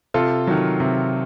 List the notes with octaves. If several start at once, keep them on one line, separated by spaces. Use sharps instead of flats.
C3 F4 A4
D#3 F#3
C3